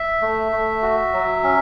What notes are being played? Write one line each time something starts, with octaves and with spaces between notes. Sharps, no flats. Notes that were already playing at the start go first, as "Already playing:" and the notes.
Already playing: E5
A3
A3
F#4
F#3
C#4